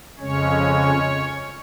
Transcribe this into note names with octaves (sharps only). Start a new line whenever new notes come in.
F2 C#3 G#3 C#4 C#5